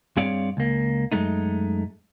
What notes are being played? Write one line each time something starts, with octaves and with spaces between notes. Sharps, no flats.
G2 C4 G#4 C#5 D5 F5
C#2 A#3
F#2 G#3 A3 D#4